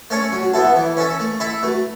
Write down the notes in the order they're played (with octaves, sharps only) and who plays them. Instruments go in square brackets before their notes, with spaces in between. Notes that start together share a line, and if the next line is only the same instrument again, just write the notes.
[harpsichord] A3 C#4 A4 C#5
[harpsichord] F#3 [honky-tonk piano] F#4
[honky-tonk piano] F#4
[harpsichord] B3 E4 A4 [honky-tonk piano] E5 A5
[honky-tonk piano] B4 E5
[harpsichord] E3
C#4 A4 E5
A3
E4 A4 E5
[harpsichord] A3 [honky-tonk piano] F#4 B4